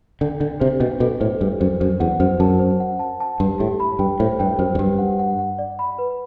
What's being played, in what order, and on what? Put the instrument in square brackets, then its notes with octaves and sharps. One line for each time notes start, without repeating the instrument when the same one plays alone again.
[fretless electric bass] D3 [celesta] D4
[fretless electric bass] D3 [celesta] D4
[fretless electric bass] C3 [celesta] C5
[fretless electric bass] B2 [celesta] D4
[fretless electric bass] B2 [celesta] A4
[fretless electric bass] A2 [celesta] C5
[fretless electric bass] G2 [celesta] D4
[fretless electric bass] F#2 [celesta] C5
[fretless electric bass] F#2 [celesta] C5
[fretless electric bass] E2 [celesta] F#5
[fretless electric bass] F#2 [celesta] C5
[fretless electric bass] F#2 [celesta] A5
[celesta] C5
F#5
A5
A5
[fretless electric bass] G2 [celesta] G4
[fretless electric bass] A2 [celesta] G4
[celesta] B5
[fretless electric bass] G2 [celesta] G5
[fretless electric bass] A2 [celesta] C5
[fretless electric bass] G2 [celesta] G5
[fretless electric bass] F#2 [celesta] C5
[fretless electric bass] F#2
[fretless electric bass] G2 [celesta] G4
[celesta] F#5
F#5
F#5
D5
B5
B4